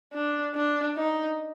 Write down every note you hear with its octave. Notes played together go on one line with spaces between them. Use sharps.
D4
D4
D#4